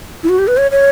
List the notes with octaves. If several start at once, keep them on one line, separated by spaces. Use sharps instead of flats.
E4
F#4
G4
B4
C#5
C#5